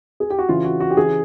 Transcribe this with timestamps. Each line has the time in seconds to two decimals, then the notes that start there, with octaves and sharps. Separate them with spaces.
0.20 G#4
0.30 G4
0.39 F#4
0.49 C#3 E3 F4
0.65 F#4
0.80 F#4
0.90 G4
0.97 C#3 E3 G#4